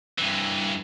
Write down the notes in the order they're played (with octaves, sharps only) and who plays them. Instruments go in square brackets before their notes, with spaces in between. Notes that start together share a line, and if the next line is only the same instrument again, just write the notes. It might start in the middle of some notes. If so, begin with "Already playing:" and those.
[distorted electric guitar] G2 E3